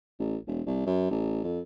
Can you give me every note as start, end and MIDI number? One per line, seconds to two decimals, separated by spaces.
0.20 0.37 33
0.47 0.61 28
0.67 0.82 36
0.86 1.07 42
1.11 1.42 33
1.44 1.60 41